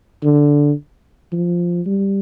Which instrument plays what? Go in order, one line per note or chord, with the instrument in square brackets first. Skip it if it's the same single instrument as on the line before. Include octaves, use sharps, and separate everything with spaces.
[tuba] D3
F3
G3